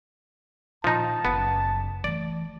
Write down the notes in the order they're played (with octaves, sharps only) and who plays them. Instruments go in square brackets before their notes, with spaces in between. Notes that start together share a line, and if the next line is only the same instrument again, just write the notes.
[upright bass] A#2 D#3 [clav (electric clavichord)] F3 D#4 [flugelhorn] A5
[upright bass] F#1 [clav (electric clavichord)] B3
[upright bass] E3 A3 [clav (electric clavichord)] D5